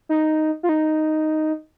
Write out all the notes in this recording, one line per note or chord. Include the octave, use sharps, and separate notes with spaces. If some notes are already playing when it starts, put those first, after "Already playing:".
D#4
F4
D#4